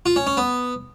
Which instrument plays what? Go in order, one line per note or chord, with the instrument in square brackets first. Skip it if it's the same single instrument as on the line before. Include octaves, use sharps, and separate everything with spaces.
[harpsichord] F4
C#4
C#4
B3